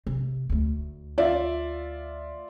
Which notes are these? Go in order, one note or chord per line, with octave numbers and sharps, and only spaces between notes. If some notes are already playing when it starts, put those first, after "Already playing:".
C3
D2 A3
F4 D5 E5